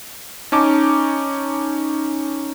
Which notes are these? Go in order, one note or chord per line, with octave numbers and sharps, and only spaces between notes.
C#4 D#4 A5 D6